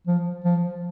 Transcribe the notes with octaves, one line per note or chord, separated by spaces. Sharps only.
F3
F3